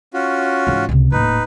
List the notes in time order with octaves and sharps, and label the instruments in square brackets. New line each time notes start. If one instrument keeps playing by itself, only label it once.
[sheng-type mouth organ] C#4 F4 F#4
[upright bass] G#2 E3
C#2 C3
[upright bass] D#1 A2 [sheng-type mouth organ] D#4 B4